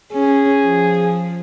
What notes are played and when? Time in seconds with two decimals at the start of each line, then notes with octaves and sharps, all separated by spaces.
0.12 C#4 G#4
0.63 F3